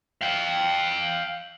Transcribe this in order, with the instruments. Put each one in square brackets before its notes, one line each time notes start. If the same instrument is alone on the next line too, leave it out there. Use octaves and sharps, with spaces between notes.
[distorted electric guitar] F5 G5